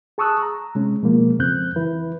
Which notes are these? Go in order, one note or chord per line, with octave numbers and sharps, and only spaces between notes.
G#4 A5 C#6 D#6 E6 F#6
A#5
C3 G#3 C#4
B2 F3 G#3 A#3
F2 C#3 C4 F#6 G6
E3 E4 B4